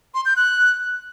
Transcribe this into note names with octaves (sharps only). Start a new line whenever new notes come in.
C6
G6
F#6